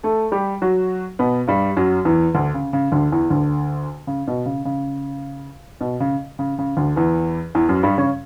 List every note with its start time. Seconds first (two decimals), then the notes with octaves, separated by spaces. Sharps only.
0.04 A3 A4
0.32 G3 G4
0.62 F#3 F#4
1.19 B2 B3
1.47 G2 G3
1.77 F#2 F#3
2.05 E2 E3
2.35 D2 D3
2.54 C#3
2.73 C#3
2.92 D2 D3
3.12 E2 E3
3.30 D2 D3
4.07 C#3
4.28 B2
4.46 C#3
4.65 C#3
5.81 B2
6.00 C#3
6.39 C#3
6.59 C#3
6.77 D2 D3
6.96 E2 E3
7.55 E2 E3
7.69 F#2 F#3
7.83 G2 G3
7.98 C#3 C#4